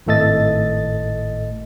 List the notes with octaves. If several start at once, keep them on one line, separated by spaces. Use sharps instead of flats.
G#1 A2 A3 A4 D#5 A6